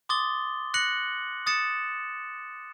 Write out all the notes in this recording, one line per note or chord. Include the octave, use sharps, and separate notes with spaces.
C6 D6 D#6 A6 G7
F#6 A#6 C#7 F#7
D#6 A6 C#7 E7